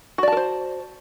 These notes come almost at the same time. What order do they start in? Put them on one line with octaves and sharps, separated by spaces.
F#4 D5 A5 A#4 C5